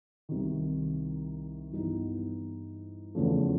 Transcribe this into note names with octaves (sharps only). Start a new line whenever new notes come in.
C2 C3 D#3
G2 E3 G3 B3 D#4
E2 C#3 F3 A3